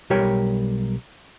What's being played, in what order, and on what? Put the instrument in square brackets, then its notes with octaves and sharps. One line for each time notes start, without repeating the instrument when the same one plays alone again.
[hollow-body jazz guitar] B1 G3 G4 A#4 C#5 G5